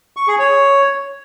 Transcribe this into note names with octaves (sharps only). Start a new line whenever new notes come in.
C#6
G#4
C#5